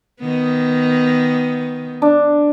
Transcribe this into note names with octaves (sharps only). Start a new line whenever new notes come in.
D#3 B3
D4